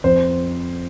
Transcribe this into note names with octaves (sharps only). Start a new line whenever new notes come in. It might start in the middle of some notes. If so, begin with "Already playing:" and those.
F2 C5